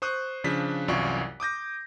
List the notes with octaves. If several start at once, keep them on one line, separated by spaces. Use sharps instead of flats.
C5 C#6 D#6 F#6
C#3 F3 D4 B6
C2 F#2 E3 F4 D5 C#6
D6 D#6 G6 A#6